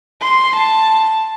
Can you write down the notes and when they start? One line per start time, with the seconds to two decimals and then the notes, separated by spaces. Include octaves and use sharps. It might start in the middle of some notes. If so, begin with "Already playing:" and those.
0.22 C6
0.56 A5